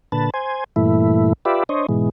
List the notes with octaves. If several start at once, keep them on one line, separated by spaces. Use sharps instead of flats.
A#2 D3 B4 A5
C5 G#5
G2 A#2 E3 A3 E4
F4 G4 B4 D5 E5
D4 C5 C#5 D#5
G#2 B2 E3 G#3